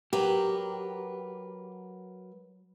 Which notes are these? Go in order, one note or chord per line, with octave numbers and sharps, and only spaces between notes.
F#3 G4 A#4 B4